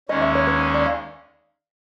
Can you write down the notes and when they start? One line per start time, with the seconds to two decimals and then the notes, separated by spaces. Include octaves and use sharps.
0.09 D#2 D#3 G#3 C#4 D#5
0.22 E5
0.35 C#5
0.47 B4
0.61 C#5
0.74 D5
0.86 F5